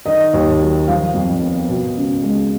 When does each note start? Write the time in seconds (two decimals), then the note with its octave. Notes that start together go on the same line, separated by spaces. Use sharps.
0.06 D#3 D#5
0.34 D#2
0.60 F#3
0.87 F3 F5
1.14 F2
1.41 B3
1.69 B2
1.97 C#2
2.23 G#3